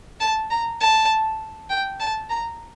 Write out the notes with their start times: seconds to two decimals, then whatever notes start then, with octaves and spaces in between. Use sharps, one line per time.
0.20 A5
0.50 A#5
0.80 A5
1.70 G5
2.00 A5
2.29 A#5